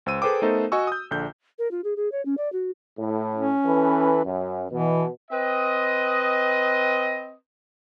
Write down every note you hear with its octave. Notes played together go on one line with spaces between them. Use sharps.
C#2 C5 E6 D#7
G#4 A4 B4 C5 G5 D6
A3 B3 D#4 A4 A#4 C5
F#4 D#5 G#5 C#6 E6
D#6 G6
A#1 D3 G6
A#4
F4
G#4
G#4
C#5
C#4
D5
F#4
A2
C#4
E3 A4 B4
F#2
B2 E3
C4 B4 D#5